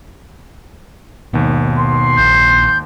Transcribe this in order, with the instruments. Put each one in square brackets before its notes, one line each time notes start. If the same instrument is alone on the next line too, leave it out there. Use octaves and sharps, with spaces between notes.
[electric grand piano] G#1 D#2 [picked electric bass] B2
[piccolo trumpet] C6
[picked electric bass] A#1 [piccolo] G6